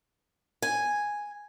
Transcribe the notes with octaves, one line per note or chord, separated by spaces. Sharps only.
G#5